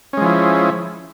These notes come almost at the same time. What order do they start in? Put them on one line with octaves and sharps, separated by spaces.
C#4 G#3 F3 E4